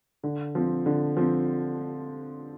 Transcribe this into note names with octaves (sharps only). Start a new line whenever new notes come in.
D3
F3 C4
D3
F3 C4